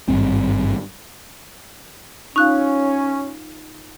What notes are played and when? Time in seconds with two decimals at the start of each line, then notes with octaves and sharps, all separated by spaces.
0.08 G#1 G2 C4
2.36 C#4 D#4 F4 F5 C#6 F#6